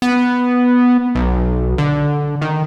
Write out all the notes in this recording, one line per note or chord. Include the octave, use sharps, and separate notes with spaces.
B3
B1
D3
D#3